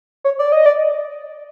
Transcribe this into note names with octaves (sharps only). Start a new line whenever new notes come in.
C#5
D5
D#5
D5